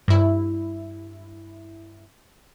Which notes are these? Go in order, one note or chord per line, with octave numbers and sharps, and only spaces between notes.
G2 E4